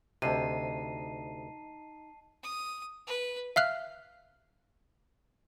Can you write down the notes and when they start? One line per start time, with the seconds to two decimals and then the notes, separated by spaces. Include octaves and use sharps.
0.22 D2 C3 D#4 A5 C7 D#7
2.43 D#6
3.07 B4
3.56 E5 F5 F6 F#6